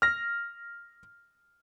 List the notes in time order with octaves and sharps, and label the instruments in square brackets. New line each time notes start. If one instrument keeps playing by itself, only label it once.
[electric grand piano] F6 A#6